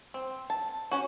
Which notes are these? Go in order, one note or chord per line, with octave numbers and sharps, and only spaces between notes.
C4
A5
C#4 F#4